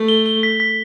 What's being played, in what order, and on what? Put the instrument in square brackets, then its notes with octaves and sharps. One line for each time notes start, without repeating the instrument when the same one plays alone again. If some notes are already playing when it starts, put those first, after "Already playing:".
Already playing: [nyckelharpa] A3
[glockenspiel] G7
G7
B6
B6